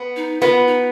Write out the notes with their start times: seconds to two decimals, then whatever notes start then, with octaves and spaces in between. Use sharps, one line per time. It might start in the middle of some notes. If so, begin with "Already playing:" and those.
Already playing: B3
0.16 D#4
0.41 B3 F4
0.67 D#4